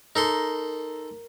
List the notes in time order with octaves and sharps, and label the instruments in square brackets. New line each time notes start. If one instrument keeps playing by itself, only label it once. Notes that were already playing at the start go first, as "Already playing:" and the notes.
[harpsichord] D#4 A4 C6 [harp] A#4